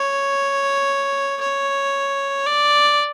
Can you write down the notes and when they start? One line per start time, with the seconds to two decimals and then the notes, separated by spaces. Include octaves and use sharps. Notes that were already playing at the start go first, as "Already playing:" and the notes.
Already playing: C#5
1.41 C#5
2.47 D5